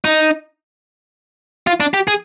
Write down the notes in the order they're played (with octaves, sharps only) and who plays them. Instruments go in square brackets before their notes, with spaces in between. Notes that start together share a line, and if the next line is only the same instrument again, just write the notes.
[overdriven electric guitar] D#4
F4
D4
G4
G#4